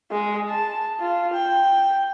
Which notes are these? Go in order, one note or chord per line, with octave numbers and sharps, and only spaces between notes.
G#3
A5
F4
G5